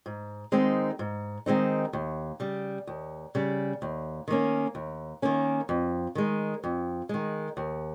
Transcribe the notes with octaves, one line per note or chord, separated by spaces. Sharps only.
G#2
D#3 G#3 C4 D#4
G#2
D#3 G#3 C4 D#4
D#2
C#3 G3
D#2
C#3 G3
D#2
D#3 A#3 C#4
D#2
D#3 A#3 C#4
F2
D#3 G#3
F2
D#3 G#3
D#2